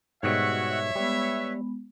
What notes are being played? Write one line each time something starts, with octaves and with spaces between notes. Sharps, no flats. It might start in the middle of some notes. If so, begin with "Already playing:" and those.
G#2 B2 G3 F#4 C#5 E5 F#5 F#6
G3 G#3 B3 B4